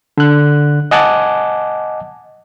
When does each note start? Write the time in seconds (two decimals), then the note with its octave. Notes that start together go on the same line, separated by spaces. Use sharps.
0.18 D3 F#6
0.91 D#5 F#5 G#5 A5 D6